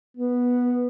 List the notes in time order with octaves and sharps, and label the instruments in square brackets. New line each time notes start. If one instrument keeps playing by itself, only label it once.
[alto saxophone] B3